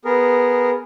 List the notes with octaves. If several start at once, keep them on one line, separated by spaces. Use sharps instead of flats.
B3 G#4 A#4